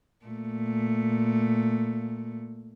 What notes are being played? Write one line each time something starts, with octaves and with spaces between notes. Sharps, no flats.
A#2 A3